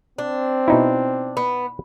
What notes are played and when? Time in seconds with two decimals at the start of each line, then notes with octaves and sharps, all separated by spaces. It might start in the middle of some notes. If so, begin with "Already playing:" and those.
0.18 C4 D4
0.68 B2 D#4 E4
1.37 B3